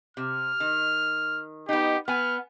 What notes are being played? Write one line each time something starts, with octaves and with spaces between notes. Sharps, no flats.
C3 F6
D#3
B3 D#4 G4
B3 G#5 F6